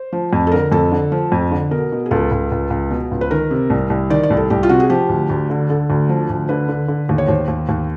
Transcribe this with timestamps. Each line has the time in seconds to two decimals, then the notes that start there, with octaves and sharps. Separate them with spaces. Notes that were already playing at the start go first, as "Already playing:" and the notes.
Already playing: C5
0.13 F3
0.33 F2
0.47 A4
0.52 D3 A#4
0.72 F2 A4
0.91 D3
1.12 F3
1.32 F2
1.52 D3
1.71 B2 A#4
1.92 B2
2.06 G#4
2.11 C#2 A4
2.32 C#2
2.52 C#2
2.70 C#2
2.90 B2
3.11 C#2
3.21 B4
3.31 D#3 A#4
3.51 C3
3.70 C2
3.90 C2
4.10 D#3 D5
4.23 D5
4.30 C2
4.37 A4
4.50 C2 G4
4.63 F4
4.69 C3 F#4
4.80 G#4
4.90 F3 G4
5.09 D2
5.29 D2
5.50 D3
5.70 D3 A4
5.90 D2
6.09 F3
6.30 D2
6.49 D3 B4
6.69 D3
6.88 D3
7.09 D#2
7.18 C#5
7.28 D#2 C5
7.48 D#2
7.69 D#2